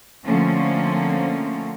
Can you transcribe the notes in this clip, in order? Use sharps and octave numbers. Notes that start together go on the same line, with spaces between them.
D3 F3 A3 A#3 C4 C#4